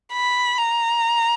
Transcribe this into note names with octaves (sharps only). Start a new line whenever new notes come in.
B5
A#5